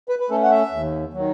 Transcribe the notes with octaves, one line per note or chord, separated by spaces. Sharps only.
B4
B4
A3 C#4 A4
F#5
E5
D#2
D#3 F#3